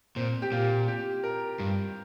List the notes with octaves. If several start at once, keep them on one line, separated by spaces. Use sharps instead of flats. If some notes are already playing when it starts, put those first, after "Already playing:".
A#2 C4
G4
A#2 F4
G4
A#4
G2